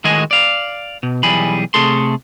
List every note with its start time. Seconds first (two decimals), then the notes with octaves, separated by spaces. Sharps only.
0.04 A2 D#3 G#3 F#4 D#5 G#5
0.31 D5 F5
1.03 B2
1.23 B1 E3 G3 G#4 B5
1.74 C3 A3 G#4 A4 C6